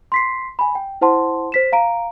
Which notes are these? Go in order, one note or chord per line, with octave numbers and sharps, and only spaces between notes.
C6 B6 C7
G#5 B5
G5
E4 C5 F#5 A5 C6
C5 B6 E7
F5 A#5 D7